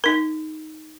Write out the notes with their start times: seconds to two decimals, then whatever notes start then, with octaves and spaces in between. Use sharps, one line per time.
0.04 D#4 A#4